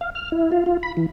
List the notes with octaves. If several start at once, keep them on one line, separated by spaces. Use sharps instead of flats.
F5
F6
E4
F4
F4
B5
E3